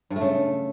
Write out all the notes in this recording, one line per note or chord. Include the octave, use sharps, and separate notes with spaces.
G2
A3
C#3